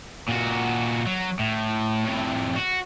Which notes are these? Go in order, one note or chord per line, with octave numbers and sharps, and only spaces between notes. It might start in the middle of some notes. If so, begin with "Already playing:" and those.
A#2 F#4
F#3
A2
A2 C3
F#4